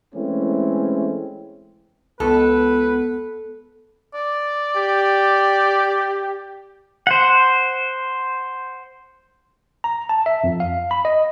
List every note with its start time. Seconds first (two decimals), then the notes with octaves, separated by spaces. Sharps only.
0.15 E3 G#3 A3 C4 C#4 E4
2.20 C#2 B3 A4 B4
4.14 D5
4.77 G4
7.07 C5 F#5
9.84 A#5
10.09 A5
10.26 E5
10.44 F2
10.60 F5
10.91 B5
11.05 D#5